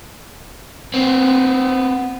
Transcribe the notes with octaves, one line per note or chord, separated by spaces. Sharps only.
B3 C4